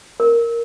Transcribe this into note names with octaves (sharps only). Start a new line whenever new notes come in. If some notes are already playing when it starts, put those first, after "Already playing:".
A#4